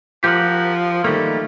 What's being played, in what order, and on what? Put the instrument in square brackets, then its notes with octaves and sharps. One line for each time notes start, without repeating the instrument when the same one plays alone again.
[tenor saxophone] F3 [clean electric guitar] G4 A#4 F#5
[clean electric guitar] D#3 G3 A#3 [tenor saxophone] A3